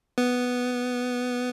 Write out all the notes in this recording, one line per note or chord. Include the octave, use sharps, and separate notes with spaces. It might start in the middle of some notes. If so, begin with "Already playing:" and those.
B3